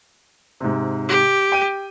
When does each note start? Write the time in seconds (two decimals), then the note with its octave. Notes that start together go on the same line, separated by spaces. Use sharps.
0.61 G#2 C3
1.08 G4
1.52 G5 D#7